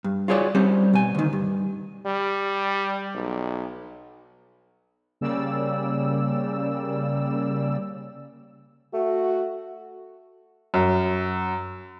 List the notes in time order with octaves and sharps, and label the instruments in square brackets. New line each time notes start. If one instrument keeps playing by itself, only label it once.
[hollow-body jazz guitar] G2
F4 F#4 G#4 C#5 D5
G3 C4 C#4 G4
B2 G#5
D2 D#3
G2
[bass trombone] G3
B1
[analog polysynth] C#3 G3 A#3 D5 E6
[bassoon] A3 [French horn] F#4
[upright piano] F#2